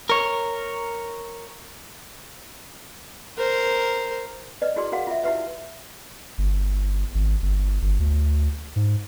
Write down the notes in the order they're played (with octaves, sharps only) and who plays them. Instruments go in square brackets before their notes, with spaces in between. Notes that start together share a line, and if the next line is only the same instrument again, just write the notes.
[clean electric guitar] A#4 C#5
[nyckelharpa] A#4 C5
[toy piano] B4 D5 D#5
E4 F#4 G#4 D5 C6
F#4 G#4 A#4 F5 F#5
F4 E5
E4 F#4 G4 B4 E5
[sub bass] G1
G#1
G1
G1
D2
G#2